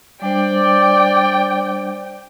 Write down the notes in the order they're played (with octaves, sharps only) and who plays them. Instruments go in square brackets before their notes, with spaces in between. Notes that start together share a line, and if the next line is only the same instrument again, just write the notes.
[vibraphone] G3 D4 C5 [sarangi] D5 [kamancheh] G5